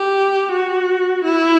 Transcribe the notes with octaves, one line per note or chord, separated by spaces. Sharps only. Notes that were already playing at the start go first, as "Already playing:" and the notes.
Already playing: G4
F#4
E4